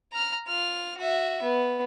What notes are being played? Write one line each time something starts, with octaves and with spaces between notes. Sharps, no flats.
A#5 F6
F4 F6
F#4 E5
B3